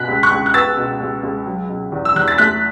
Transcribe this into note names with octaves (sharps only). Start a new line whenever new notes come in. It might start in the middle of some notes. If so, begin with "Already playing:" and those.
Already playing: B2 F#6 B6
C#2
C#6 F#6
C#2
F#6
B3 E6 A6
B2
C#2
C#2
F#3
B2
E2
E6
E2 F#6
A6
A3 F#6 B6